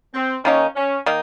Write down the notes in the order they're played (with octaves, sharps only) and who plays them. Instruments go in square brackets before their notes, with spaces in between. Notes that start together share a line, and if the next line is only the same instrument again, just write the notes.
[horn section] C4
[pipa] D#3 A#3 D#4 [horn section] C#4
[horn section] C#4
[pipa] D#3 A#3 D#4